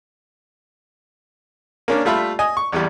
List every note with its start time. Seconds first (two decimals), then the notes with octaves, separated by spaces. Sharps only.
1.88 A#3 C#4 D4
2.05 G3 A3 F4 E5 B5
2.39 D#5 G#5
2.57 C#6
2.72 A1 E2 G3